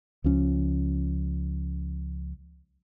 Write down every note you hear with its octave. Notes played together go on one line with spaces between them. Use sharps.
C#2 F3 C#4